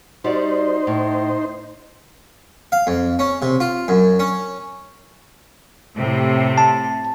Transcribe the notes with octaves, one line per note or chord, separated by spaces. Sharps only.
G3 D#4 F#4 C5 D5
A2
F5
F2
C#4
C3
F4
F#2
C#4
A2 C3
A5